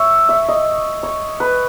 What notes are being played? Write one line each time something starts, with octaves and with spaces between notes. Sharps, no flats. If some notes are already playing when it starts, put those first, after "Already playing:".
Already playing: C#5 E5
E5
D#5
C#5
B4